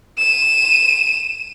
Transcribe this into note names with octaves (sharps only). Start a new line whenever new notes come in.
D#7 E7